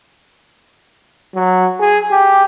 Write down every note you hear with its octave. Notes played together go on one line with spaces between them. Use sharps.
F#3
G#4
G4